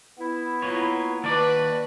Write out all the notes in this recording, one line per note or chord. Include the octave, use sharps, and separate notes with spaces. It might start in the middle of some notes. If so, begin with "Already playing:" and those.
B3 E4
A#3 F4 B4 C#5
D#2 D4 F#4 B4 D5